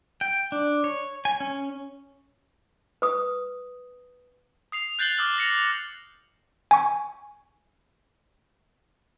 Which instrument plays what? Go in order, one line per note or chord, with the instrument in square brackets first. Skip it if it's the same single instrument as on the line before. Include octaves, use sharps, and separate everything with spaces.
[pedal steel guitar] G5
D4
C#5
G#5
C#4
[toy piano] B4 D#6
[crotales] D#6 C7 F7
F#6 G6 A6 C7 F#7 G7
D6 D#6 F6 F#6 F#7
A#6 C#7
[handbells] G#5 C#6